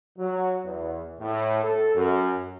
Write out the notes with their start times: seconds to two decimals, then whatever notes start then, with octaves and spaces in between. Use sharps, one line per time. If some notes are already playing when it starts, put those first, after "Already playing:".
0.18 F#3
0.65 E2
1.20 A2
1.63 A4
1.95 F#2